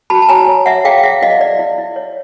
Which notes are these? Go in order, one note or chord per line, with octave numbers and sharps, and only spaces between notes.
F#4 A5 B5
A5
C#5 G#5 A#5
C#5
C#5 E5 F#5
G#4 F5 G5
F5
G#4 E5 F#5
E4 D#5 F5
E4 D5
E4
E4
C#5